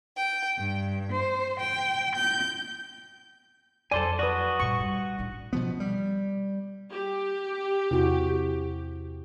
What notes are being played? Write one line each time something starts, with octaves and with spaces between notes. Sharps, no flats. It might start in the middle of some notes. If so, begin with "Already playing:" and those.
G5
G2
C5
G5
G6
F2 F#3 A4 C5 D5 G#5
F#4 B4 D5 D#6
G2 A#2 C#6
G3
A1 D4
B2 F3 B3
G3
G4
E2 C3 F#4